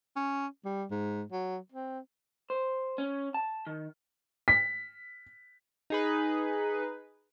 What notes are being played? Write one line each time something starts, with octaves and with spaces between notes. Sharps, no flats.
C#4
G3
G#2
F#3
C4
C5
C#4
A5
D#3
B6
D#4 G#4 B4